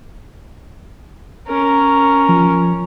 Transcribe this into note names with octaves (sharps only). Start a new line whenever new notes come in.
C#4 A#4
F3